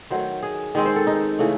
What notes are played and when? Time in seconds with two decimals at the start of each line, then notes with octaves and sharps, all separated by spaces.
0.10 D#3 F#3 A3 C5
0.43 G#4
0.75 D#3 G#3 C4
0.85 C5
0.96 A4
1.07 D#4
1.39 C#3 E3 A3